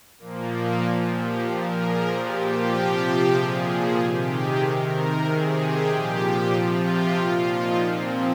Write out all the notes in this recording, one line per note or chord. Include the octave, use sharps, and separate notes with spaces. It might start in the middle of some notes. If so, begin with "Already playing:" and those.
A#2 F3 A#3
A#2 F3
G4
A#2 F3 A#4
G#4
A#2 F3 G4
F4
C3 F3 G4
A#2 F3 G#4
G#4
C3 D#3 G4
G#4
C3 D#3 A#4
C3 D#3 G#4
G4
A#2 F3
C3 F3 F4
G4
A#2 F3 F4
D#4
A#2 F3 C4